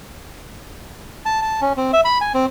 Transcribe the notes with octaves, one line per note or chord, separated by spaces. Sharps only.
A5
A5
C#4
C4
E5
B5
G#5
C4